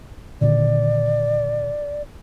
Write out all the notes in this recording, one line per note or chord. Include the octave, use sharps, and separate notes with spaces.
A#2 D3 D#3 D5